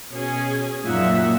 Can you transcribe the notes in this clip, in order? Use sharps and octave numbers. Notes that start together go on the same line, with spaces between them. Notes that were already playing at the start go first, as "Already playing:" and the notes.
B2 C#4 G#4 G#5
F#2 A#2 F#3 D#4 F4 E5 F#5